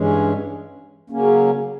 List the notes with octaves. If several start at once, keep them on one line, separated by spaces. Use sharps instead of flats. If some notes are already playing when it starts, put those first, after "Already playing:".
Already playing: G2 E3 G#3 C#4
C#3 F#3 A#3 C#4